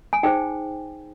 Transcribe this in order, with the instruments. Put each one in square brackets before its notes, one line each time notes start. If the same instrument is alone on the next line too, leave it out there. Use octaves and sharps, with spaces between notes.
[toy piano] G#5
D#4 G#4 C5 G5